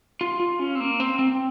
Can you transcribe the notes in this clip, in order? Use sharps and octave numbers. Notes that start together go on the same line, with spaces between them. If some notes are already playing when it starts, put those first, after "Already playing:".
F4
F4
C#4
C4
A#3
C4
C4